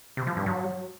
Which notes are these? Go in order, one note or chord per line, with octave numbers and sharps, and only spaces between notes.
C3
F3
G2
F#3